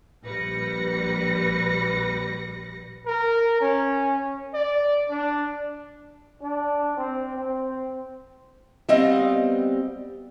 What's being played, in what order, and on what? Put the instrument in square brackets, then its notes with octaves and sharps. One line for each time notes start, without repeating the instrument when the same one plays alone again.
[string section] A#1 G3 B4 A#6 C#7
[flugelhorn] A#4
C#4
D5
D4
[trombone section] D4
C4
C4
[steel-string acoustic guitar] G3 B3 C4 D#5 F5